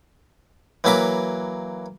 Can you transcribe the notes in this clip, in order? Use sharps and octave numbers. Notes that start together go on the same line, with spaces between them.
E3 F#3 A#3 F5 B5 D6